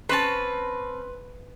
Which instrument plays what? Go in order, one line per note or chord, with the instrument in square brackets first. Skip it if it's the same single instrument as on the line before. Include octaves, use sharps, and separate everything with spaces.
[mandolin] C4 C#4 A5 [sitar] B4